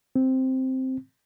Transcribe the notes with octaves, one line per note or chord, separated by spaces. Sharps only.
C4